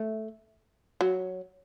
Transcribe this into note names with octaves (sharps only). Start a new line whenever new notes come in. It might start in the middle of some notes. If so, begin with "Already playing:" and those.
Already playing: A3
F#3